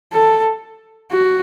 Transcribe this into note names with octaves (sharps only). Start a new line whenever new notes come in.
A4
F#4